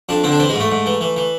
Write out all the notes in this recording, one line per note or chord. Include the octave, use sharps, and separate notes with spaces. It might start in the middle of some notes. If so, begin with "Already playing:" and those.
F2 D4
D3 C4
D4
E3 C4
G#3
G#2
A3
G#2
E3
E3
E3